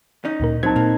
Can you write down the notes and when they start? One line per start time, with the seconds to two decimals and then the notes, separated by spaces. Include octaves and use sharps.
0.25 C#4 D#4
0.40 D2 A#2 A#4
0.63 F#3 C4 D#4 A5 G#6
0.76 A#2 A#3